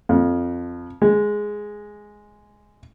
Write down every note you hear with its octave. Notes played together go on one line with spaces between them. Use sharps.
F2
G#3